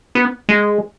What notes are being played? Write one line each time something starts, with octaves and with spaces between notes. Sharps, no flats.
B3
G#3